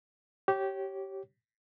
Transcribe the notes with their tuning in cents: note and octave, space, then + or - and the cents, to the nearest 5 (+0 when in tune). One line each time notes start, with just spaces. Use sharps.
G4 -20 C#5 -15